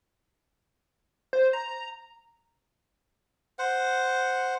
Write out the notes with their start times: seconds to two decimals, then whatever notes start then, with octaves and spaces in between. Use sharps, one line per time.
1.33 C5
1.53 A#5
3.59 C5 F#5